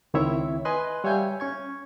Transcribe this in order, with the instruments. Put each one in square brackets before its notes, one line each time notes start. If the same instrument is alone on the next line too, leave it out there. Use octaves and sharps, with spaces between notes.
[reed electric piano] C#2 D#3 C4 E4 C#5 E5
B4 D#5 G#5 C6 F#6
G3 C#5 E5 F5 G#5 G6
C#4 C#6 G#6